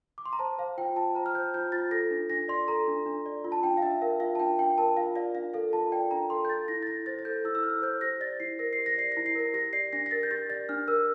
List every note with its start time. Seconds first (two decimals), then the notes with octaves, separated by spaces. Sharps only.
0.18 D6
0.26 C6
0.33 A#5
0.39 C5 A5
0.58 C5 F5
0.78 F4 G5
0.96 F4 A5
1.15 C5 A#5
1.26 F6
1.35 C5 G6
1.54 F4 G6
1.72 F4 A6
1.91 A4 A#6
2.11 D4
2.30 D4 A#6
2.48 D5 C6
2.68 A4 A#5
2.88 D4
3.06 D4
3.26 D5
3.44 F4
3.52 A5
3.63 D4 G5
3.77 F5
3.82 D4 E5
4.02 A#4 F5
4.20 F4 F5
4.35 A5
4.39 D4 G5
4.58 D4 G5
4.78 A#4 A5
4.97 F4 F5
5.16 D5 F5
5.35 D4 F5
5.54 A4 F5
5.73 F4 A5
5.92 D5 G5
6.11 D4 A#5
6.30 A4 C6
6.45 G6
6.49 A4 A6
6.68 E4 A#6
6.83 A6
6.87 E4 A#6
7.06 C5 A6
7.19 A6
7.25 A4 G6
7.45 E4 E6
7.55 E6
7.63 E4 F6
7.82 C5 G6
8.01 G4 A#6
8.21 D5 A6
8.40 E4 C7
8.59 A#4 A#6
8.73 G4 C7
8.86 A#6
8.98 D5 C7
9.12 E4 A#6
9.26 C7
9.35 A#4 A#6
9.54 G4 A#6
9.73 D5 C7
9.93 D4 A#6
10.06 A#6
10.11 A#4 A6
10.23 G6
10.31 G4 A6
10.50 D5 A6
10.69 D4 F6
10.88 A#4 E6